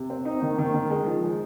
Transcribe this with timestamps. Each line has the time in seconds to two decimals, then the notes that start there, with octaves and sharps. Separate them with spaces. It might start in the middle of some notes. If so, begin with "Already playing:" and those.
Already playing: C3
0.10 C4
0.25 D#4
0.42 D#3
0.58 D#3
0.74 D#3
0.90 G#3
1.06 F3
1.23 G#3